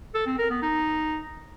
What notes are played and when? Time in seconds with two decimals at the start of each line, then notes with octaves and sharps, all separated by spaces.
0.15 A4
0.27 C4
0.39 A#4
0.51 B3
0.63 D#4